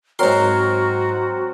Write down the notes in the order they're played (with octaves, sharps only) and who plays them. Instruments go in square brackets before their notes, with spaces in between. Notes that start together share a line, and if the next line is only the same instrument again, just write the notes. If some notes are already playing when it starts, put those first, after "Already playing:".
[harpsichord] G#2 C6 [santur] F#3 C4 A#4 [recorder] F#4